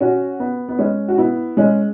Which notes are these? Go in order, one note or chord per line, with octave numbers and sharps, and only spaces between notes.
C#4 F#4
B3
B3
G#3 C#4
F#4
B3 E4
G#3 C#4